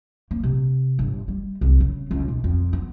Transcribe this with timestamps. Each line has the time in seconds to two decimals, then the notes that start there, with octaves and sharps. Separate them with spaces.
0.31 A#3
0.43 C3
0.99 G1
1.28 G3
1.61 C2
1.80 C#3
2.11 C#2
2.28 B1
2.44 F2
2.73 B3